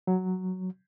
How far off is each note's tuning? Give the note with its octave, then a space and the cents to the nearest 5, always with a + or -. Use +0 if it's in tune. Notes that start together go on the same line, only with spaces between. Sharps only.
F#3 +0